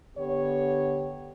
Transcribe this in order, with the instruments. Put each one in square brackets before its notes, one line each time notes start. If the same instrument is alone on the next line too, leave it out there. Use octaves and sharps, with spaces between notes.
[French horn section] D3 B3 G4 C#5